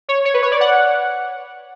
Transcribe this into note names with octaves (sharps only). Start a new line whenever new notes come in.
C#5
C#5
B4
C#5
D5
F#5